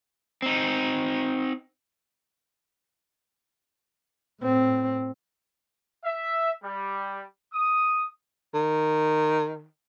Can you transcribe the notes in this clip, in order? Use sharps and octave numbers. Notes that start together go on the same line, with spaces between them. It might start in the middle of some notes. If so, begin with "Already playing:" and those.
C4 D#4
A2 C4
E5
G3
D#6
D#3